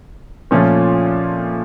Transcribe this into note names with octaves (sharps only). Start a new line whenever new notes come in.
A#2 F3 A3 C#4 F4